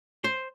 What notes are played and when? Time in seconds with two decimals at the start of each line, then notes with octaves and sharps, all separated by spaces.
0.24 C5